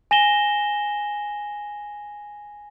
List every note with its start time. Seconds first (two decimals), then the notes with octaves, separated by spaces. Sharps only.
0.11 G#5 A#6 E7 G7